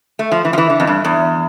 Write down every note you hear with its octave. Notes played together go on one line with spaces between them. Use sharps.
A3
F3
E3
F3
E3
D3
F2
G2
E2